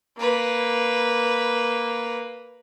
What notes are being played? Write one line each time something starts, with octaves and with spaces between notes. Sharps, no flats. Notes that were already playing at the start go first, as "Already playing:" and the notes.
A#3 B4